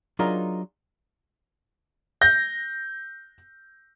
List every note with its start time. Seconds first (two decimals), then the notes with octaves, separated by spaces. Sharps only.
0.19 F#3 D4 D#4 F4 G#4 A#4
2.21 G6 A#6